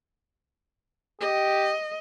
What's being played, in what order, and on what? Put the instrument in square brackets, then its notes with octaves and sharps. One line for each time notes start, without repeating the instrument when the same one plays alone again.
[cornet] G4 [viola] D#5